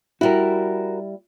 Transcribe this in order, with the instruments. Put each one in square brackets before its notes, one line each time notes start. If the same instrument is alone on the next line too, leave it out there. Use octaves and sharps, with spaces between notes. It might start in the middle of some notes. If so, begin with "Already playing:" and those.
[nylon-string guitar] G3 E4 [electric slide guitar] F#4 A#4